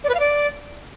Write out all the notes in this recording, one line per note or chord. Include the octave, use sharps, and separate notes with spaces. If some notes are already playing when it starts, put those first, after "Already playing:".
D5
B4
F5
D5